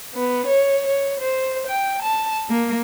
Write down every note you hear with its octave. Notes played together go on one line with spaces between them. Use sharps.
B3
C#5
C#5
C5
G5
A5
A#3